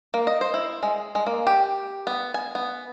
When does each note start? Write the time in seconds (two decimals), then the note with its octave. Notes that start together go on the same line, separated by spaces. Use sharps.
0.14 A#3
0.27 D#5
0.41 C5
0.54 E4
0.83 G#3
1.15 G#3
1.27 A#3
1.47 G4
2.07 B3
2.34 G#5
2.55 B3